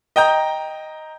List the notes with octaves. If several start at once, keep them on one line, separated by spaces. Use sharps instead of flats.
D#5 G5 A#5 G6